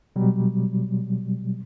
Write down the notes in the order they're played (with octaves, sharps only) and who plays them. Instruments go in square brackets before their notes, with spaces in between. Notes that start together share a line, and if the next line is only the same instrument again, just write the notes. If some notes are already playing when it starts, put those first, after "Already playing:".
[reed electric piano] B2 F#3 G3